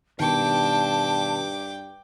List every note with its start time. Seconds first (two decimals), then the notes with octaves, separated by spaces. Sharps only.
0.20 G2 B2 D#3 G5 A5 D6